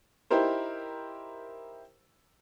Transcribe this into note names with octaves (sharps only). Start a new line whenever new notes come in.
D#4 E4 G4 A#4 C5